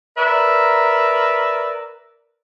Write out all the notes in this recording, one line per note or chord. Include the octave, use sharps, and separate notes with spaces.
A#4 B4 D5 E5 A#5